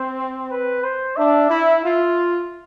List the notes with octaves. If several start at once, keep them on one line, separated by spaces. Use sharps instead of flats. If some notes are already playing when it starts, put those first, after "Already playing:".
Already playing: C4 C5
B4
C5
D4 E5
E4
F4